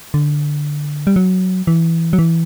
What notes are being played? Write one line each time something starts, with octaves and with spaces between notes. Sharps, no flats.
D3
G3
F#3
E3
F#3
E3